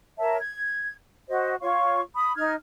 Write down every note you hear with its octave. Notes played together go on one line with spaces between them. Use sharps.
A#4 C#5 E5 A5
G#6
F#4 C5 D#5
F4 C#5 F5 C#6
B5 D#6
D#4 F6 G#6